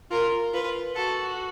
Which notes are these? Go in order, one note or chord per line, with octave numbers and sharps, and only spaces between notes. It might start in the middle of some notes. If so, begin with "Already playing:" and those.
F4 A#4
F4 B4
F#4 A4